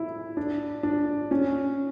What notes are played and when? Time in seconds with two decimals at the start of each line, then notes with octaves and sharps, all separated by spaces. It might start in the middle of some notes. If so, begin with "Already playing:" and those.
Already playing: E4
0.37 D4
0.83 D4
1.31 C#4